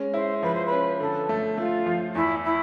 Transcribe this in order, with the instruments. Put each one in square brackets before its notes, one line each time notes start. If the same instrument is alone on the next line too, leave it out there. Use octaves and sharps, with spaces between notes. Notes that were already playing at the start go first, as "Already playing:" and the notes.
Already playing: [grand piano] G#3 C#4
[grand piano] E4 [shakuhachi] C5
[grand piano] F3 [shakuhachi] B4
[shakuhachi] C5
B4
[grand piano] C#4
[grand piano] D3 [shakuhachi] A4
[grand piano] A3
[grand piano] A3 [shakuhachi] F4
[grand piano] F3
[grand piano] E2 [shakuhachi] E4
[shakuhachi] E4